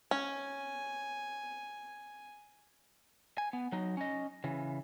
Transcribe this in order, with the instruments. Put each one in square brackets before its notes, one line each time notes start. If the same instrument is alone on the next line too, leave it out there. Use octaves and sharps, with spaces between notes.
[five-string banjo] C#4 [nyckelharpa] G#5
[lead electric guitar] G#5
B3
F#3 D#4
C#4 D#5
C#3 E3